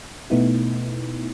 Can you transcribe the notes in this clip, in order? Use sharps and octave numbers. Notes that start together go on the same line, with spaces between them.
B2 A3 B3 D#4 E4